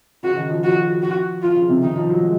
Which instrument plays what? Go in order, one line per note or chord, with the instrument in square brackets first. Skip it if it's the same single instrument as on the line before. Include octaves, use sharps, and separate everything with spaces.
[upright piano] C#3 [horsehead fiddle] F#4
[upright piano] D#3
F3
[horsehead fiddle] F#4
F#4
[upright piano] F3 [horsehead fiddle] F4
[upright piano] C#3
C3
[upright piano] D#3 [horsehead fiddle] D#4
[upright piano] F3
F#3
G#3